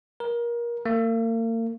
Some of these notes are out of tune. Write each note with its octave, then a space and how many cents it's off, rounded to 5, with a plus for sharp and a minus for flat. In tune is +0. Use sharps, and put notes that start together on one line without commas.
A#4 +25
A#3 -40